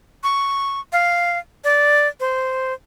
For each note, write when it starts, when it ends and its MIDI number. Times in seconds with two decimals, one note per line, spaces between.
0.24 0.80 85
0.92 1.38 77
1.64 2.08 74
2.20 2.73 72